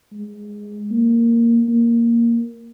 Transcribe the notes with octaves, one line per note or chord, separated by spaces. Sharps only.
G#3
A#3
A#3